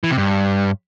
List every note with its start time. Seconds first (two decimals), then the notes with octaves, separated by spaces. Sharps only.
0.04 E3
0.11 C3
0.18 G2